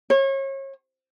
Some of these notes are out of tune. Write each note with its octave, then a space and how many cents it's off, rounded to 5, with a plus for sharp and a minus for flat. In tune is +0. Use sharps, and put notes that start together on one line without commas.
C#5 -35